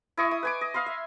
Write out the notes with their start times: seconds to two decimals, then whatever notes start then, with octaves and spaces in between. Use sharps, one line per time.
0.17 E4 D#5 C#6
0.31 D#6
0.43 B4 G#5 D6
0.61 D#5
0.74 D#5 F5 B5 C6
0.86 E5